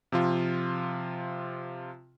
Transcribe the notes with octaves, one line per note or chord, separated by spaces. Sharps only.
C3 F3 F4